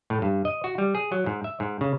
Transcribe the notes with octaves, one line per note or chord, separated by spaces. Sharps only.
A2
G2
D#5
F#4
G3
G#4
F#3
G#2
E5
G#2
C#3